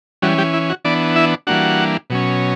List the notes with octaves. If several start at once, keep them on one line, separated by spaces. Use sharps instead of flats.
E3 G3 C#4 F#4
G3 G4
E4
F#4
E3 B3 D4 D5
E4 E5
E3 G3 A#3 D4 F#4 F#5
B2 F#3 C#4